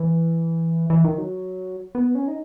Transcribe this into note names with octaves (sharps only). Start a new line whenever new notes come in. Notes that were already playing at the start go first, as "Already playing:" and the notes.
Already playing: E3
E3
D#3
F#3
B3
C#4
D#4